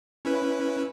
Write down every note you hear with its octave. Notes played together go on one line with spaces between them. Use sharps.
C#4 E4 B4